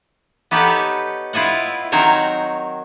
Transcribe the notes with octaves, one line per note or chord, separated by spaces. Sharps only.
B3 D#4 G4 A4 B4 C#5
E4 F4 D#5 E5 F#5
D#3 F#3 C4 A#4 C#5